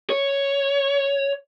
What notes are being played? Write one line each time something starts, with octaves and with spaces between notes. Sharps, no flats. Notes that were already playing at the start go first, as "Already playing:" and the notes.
C#5